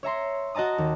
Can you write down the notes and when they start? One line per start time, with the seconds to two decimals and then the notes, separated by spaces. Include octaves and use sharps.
0.03 C#5 E5 A#5 C6
0.55 F#4 D#5 A5 A#5 D#6
0.78 D#2